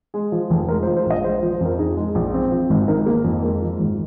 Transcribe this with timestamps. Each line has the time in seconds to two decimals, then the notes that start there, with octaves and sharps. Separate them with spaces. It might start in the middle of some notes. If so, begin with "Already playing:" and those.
0.14 G#3 G#4
0.32 F3
0.50 F1
0.69 G#3 A#4
0.83 C5
0.87 F3
0.97 C5
1.06 A#1 D#5
1.24 G#3 C5
1.38 C5
1.43 F3
1.52 C5
1.60 F2 A#4
1.79 D#4 G#4
1.97 G#3
2.15 A#1
2.34 C4
2.51 F3
2.70 G#1
2.88 D#4 A#4
3.06 A#3
3.15 A#4
3.24 F2
3.42 G#3 A#4
3.62 F3
3.80 G#1